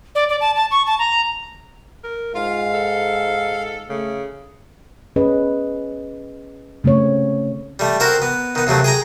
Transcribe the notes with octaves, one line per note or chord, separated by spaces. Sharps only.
D5
D5
A5
A5
C#6
A5
A#5
A#4
G#2 F4 F5
A4
C#3 A3
C#4 G#4 B4 D#5
C#3 A3 C4 C#5
G3 A3
C4 F#4 A#4 C5
B3
D#3 B3
D#2 C3 F#3 A3
G#4 G5 A#5